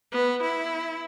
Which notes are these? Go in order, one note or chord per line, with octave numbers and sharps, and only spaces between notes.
B3
E4